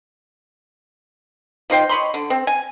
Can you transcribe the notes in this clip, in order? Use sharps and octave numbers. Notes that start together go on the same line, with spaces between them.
F3 D#4 C5 G5
C#5 D#5 B5 C6
D3
C4
G#5